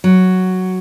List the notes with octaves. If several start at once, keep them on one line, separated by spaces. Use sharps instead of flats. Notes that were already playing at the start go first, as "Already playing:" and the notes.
F#3